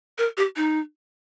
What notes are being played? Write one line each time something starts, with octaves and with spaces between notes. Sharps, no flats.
A#4
G4
D#4